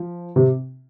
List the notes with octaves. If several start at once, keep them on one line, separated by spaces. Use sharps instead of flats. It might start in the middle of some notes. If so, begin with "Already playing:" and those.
Already playing: F3
C3